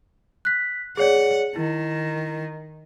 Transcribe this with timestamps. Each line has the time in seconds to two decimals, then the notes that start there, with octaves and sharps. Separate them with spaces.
0.45 F#6 B6
0.97 G#4 C#5 D5 F#5
1.56 D#3 E4